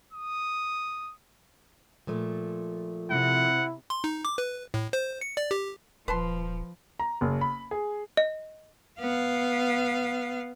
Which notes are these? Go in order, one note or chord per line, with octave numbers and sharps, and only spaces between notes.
D#6
A#2 F3 A3
C3 E4 F#5
C6
D#4
D6
B4
A2
C5
C#7
D5
G4
D#1 F3 B4 A5 C6
A#5
F#1
B5
G#4
D#5
B3 F5